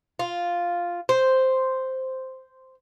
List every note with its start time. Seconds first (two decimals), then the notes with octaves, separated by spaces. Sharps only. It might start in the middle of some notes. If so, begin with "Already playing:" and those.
0.19 F4
1.09 C5